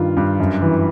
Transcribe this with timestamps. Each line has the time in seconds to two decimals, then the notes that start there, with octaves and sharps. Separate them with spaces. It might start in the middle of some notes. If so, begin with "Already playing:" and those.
Already playing: G2 D#3 F4
0.17 G2
0.40 F#2
0.62 E3